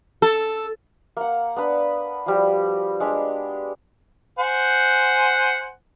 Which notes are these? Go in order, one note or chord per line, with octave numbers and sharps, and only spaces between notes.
A4
A#3 F#5
B3 D4 B4
F3 G3 F#4
G#3 D4 G4
C5 F#5 G#5